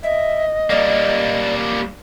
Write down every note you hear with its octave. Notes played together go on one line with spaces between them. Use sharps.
D#5 E5
G3 A#3 D5